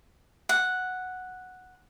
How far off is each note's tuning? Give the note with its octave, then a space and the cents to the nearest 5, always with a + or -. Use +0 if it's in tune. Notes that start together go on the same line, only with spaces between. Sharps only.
F#5 -5